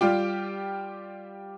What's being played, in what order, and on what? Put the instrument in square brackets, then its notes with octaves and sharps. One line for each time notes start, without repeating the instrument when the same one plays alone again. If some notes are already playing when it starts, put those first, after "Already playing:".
[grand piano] G3 F4 G4